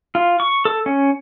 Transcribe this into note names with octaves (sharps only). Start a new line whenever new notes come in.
F4
C#6
A4
C#4